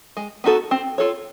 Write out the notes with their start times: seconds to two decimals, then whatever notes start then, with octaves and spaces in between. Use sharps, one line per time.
0.17 G#3
0.44 B3 D#4 F#4 A4
0.71 C4
0.98 F4 A4 C#5